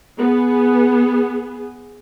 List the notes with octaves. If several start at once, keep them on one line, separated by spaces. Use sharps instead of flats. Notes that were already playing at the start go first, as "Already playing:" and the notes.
B3 G#4